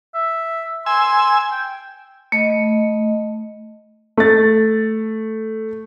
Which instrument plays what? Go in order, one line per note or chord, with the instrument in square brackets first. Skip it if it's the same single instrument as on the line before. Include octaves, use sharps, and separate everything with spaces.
[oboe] E5
[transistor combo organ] G#5 E6 [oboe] C6
[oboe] G5
[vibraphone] A3 D#5
[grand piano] A3 A6